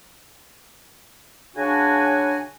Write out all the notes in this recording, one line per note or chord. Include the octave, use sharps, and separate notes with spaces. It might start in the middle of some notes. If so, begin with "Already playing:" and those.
C#3 D4 F#4 G#5